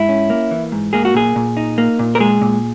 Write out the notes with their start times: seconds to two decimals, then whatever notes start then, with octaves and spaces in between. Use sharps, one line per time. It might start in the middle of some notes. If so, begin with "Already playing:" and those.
Already playing: G#2 E4
0.09 C#4
0.30 A#3
0.51 E3
0.72 G#2
0.93 A#3 G#4
1.05 F#4
1.14 A#2 G#4
1.36 A#2
1.57 D#4
1.78 A#3
1.99 A#2
2.15 A#4
2.20 G#3 G#4
2.41 A#2